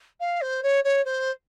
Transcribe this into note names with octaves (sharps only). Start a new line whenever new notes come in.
F5
C5
C#5
C#5
C5